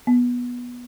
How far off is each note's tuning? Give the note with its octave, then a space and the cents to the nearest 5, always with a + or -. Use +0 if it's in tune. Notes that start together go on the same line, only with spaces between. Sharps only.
B3 -15